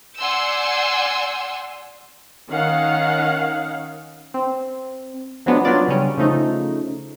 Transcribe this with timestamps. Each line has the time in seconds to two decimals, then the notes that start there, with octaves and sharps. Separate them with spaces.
0.17 D5 F#5 G#5 C6 E6 G6
2.49 D#3 C#4 F5 F#5
4.34 C4
5.46 F3 F#3 G#3 B3 D4
5.65 F#3 B3 D4 F4 D5
5.88 C#3 G3 C#4
6.18 C#3 F3 A3 D#4